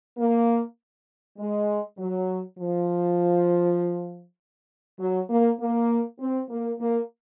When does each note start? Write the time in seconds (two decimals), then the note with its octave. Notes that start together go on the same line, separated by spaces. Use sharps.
0.18 A#3
1.38 G#3
1.98 F#3
2.58 F3
4.99 F#3
5.29 A#3
5.59 A#3
6.20 C4
6.50 A#3
6.79 A#3